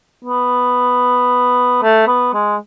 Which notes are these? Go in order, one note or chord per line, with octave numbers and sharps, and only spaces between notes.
B3
A3
B3
G#3